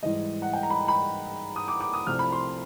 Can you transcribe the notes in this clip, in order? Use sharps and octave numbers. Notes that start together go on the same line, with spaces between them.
G#2 E3 G3 D#5
F#5
G5
A#5
B5
B5
D#6
D6
D6
D#6
C2 C3 F3 A3 F6
B5
C6